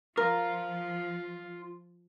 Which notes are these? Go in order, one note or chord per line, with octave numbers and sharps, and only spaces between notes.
F3 F4 A#4 F5